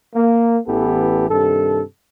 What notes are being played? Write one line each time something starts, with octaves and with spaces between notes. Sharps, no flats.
A#3
A1 E3 B3 G4 A4
G2 C3 D#3 A4